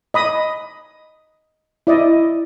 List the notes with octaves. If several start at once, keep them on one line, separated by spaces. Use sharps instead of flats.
D#5 B5 D#6
E4 D5 D#5